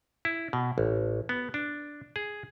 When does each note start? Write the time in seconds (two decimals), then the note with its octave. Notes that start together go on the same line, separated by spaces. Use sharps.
0.25 E4
0.53 B2
0.78 A1
1.29 B3
1.54 D4
2.16 G#4